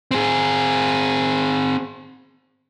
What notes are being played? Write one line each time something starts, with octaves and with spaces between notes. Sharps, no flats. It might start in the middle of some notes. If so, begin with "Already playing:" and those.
C4 G#4